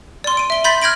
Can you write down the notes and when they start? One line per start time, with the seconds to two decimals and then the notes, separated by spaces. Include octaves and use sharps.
0.24 D5 C6
0.37 D7 D#7
0.50 E5 G7
0.64 B5 C6 G6 A6 B6
0.82 F6 G6 G#6 A#6 D7 F#7